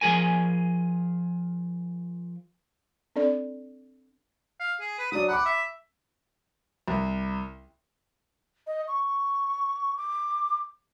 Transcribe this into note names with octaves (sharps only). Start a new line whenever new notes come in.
F3 G#4 A#4 G#5
C4 D4 A4 D5
F5
G#4
B4
F#3 D4 D#6
F#5 B5 D6
E5
C2
D#5
C#6
D6